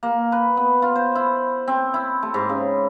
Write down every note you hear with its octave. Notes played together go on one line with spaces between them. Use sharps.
A#3
B4
B3
F4
C5
E4
C4
E4
A3
G#2
C#3